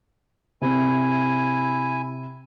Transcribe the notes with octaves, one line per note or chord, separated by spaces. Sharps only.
C3 E4 G#5